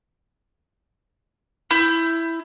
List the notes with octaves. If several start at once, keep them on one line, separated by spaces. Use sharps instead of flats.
E4 G6